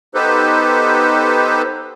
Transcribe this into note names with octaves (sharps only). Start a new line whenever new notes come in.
B3 D#4 G4 A4 B4 C5